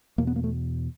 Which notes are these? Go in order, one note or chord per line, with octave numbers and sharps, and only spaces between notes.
E2 B2 A#3
B3
A#3
A3